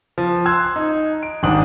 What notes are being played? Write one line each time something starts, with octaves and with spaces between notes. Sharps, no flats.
F3
C6 E6 F#6 G#6
D#4
D7
D#1 G#1 G#2 D4 D#6 F#7